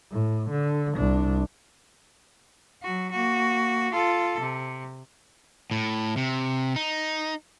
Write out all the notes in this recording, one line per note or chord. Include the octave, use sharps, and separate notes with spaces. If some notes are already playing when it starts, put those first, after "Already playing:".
A2
D3
C2 D4
F#3 F#4
A#3 F#4
F4 A4
C3
A2
C3
D#4